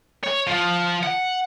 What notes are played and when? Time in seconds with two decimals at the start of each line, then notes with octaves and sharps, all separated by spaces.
0.24 C#5
0.47 F3
1.03 F#5